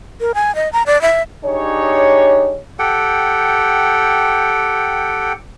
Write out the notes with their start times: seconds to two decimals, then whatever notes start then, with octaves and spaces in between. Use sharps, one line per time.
0.21 A#4
0.35 G#5
0.55 D#5
0.73 A#5
0.87 D5
1.02 E5
1.45 D4 D#4 G4 G#4 C#5
2.79 G4 A4 F#5 G5